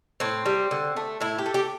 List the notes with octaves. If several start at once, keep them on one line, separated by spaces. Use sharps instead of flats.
A2 C4
G3
D3
A3
A2 E4
G4
A3
G4